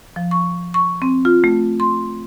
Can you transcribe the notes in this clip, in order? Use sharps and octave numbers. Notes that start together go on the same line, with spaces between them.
F3
C#6
C#6
C4
F4
A3
C6